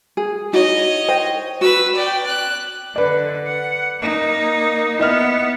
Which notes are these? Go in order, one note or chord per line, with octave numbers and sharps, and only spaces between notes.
G#4
D#4 E4 F#4 C#5 D#5
C5 G5
F#4 B4 E6
D5 G5
F#6
D3 B4 D5
F#5
A#3 D#4
B3 E4 D#5 F6